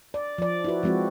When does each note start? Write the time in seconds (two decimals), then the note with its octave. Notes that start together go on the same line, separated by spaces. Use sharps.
0.14 D5
0.38 F3 D5
0.64 E4 F#4 B4
0.83 F3 G#3 C4 F#4